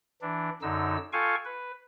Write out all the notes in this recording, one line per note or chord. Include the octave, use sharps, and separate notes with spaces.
E3 D4
F#2 D3 D#4 E6
F4 A4 F5 G5 G#5 C#6
B4